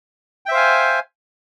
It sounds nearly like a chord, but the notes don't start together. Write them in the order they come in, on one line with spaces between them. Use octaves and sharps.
G5 E5 C5 F5 G#5